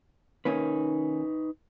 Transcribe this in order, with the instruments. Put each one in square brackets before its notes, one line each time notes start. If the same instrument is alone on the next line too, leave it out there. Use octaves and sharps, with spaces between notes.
[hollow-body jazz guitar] D#3 A#3 C#4 [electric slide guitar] D#4 B4